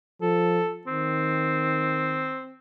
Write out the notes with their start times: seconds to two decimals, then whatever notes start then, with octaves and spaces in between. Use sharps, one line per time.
0.22 F3 A4
0.87 D#3 C4